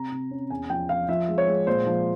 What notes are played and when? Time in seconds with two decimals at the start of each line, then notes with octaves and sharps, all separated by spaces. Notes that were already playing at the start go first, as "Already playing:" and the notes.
Already playing: C3 A#5
0.12 C3
0.31 C#4
0.50 E2 G#5
0.70 F3 G5
0.89 F3 F5
1.08 F3 E5
1.28 G#3
1.38 C#5
1.47 G#3
1.67 A#2 C5
1.86 F3